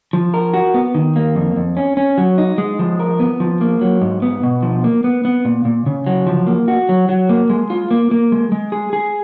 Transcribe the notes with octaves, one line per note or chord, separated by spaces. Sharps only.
F3
A#4
F#4
B3
D#3
A#3
F2
F2
C#4
C#4
F#3
D#4
G#3
F3
A#4
B3
F3
A#3
F#3
G#2
B3
B2
F3
A#3
B3
B3
A#2
A#2
C#3
F#3
F3
A#3
F#4
F#3
F#3
A#3
G#3
F4
A#3
A#3
G#3
G#3
G#4
G#4